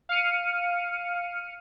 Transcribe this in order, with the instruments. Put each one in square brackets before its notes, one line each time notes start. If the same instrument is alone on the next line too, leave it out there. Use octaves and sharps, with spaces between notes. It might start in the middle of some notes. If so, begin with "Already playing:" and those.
[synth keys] F5 F6 C#7 D#7